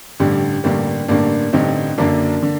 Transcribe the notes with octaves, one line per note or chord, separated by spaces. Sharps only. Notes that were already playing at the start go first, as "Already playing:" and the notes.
A1 G2 D3 G3
A1 G2 D3 G3 A#3
A1 G2 D3 A#3 D4
A1 G2 D3 C4 D#4
F#1 F#2 D3 A#3 D4
D3